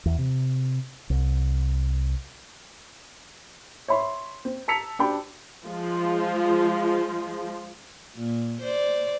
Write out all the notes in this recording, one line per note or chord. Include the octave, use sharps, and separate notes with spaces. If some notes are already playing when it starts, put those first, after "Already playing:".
E2
C3
C2
C#5 E5 B5 C6
C4
A5 A#5 E6 B6 C#7 F7
D4 F#4 G4 G5 A5 B5
F3 G#3
A#2
C5 D5